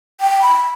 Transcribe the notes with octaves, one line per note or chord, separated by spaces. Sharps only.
G5
B5